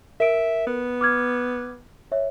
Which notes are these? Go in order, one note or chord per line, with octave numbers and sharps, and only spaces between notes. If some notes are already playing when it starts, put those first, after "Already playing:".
A#4 E5 D7
B3
D6 F6 G#6
C#5 E5